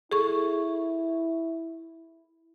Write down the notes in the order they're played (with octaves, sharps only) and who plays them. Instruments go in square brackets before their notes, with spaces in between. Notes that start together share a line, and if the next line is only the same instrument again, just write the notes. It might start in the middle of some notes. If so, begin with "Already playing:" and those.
[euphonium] E4 [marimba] G#4 A4 C#6